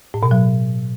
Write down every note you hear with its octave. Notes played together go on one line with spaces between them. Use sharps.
A2
B2
F#3